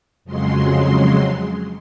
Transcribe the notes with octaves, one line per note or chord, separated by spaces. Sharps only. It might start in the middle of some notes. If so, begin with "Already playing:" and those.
F2 C#3 F#3 G#3 C6